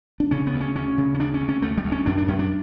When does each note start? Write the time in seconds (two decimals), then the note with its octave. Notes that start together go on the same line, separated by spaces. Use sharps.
0.20 D4
0.31 C#3 C#4
0.47 B3
0.53 D2
0.61 C#4
0.75 D2 C#4
0.98 C#3
1.14 C#4
1.19 D2 D4
1.34 C#4
1.41 D2
1.49 C#4
1.62 D2 A3
1.78 G3
1.85 D2
1.92 C#4
2.06 F#2 D4
2.18 D4
2.28 F#2 C#4
2.39 D4